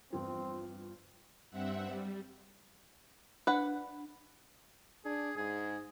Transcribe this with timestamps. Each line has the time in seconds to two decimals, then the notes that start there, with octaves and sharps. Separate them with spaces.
0.13 E2 G2 F3 C4
1.51 G2 C4 E5 F#5
1.88 G3
3.47 D4 B4 F#5
5.05 D4 G#4
5.37 G#2 G#4